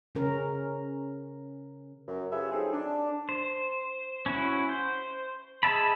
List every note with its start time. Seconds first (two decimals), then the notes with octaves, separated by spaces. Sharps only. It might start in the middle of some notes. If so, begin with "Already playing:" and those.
0.15 C#3 C#4 A#4
2.08 F#2
2.32 F4 G4 G#4 B4 C#5 E5
2.52 F#3 A3 C4 D#4 G#4
2.72 D4
3.29 C5
4.26 C#4 E4 F#4
4.69 C5
5.63 G#4 D#5 E5 A5 B5